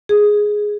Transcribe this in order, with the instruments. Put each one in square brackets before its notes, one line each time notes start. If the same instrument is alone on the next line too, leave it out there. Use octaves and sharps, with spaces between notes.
[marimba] G#4